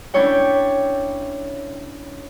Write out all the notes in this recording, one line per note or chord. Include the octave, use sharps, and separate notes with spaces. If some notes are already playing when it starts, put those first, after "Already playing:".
C#4 D4 E4 C#5 G5